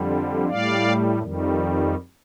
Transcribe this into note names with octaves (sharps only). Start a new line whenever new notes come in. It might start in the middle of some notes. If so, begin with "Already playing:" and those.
Already playing: F2 D3 G3
A2 G3 D5 F5
F2 D#3 G3